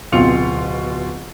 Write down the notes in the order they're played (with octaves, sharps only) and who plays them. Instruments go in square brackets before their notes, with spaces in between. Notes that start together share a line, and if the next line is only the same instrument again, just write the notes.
[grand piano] D1 B2 C4 F4 C#7 F7